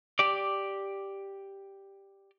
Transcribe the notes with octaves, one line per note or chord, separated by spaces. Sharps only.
G4 D5